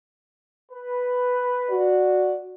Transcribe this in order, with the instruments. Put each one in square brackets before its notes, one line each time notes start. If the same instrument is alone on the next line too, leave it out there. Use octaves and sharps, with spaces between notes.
[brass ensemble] B4
[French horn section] F#4 D5